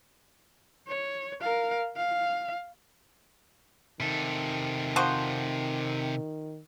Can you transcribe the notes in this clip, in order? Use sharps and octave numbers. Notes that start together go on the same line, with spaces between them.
C#5
A#4 F5
F5
C3 D#3 A4
F3 F#4 C5